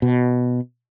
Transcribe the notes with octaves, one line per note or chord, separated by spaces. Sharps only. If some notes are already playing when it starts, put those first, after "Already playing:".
B2